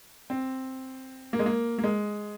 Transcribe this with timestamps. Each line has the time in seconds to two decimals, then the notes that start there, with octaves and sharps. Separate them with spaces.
0.30 C4
1.33 A#3
1.39 G#3
1.46 A#3
1.78 A#3
1.84 G#3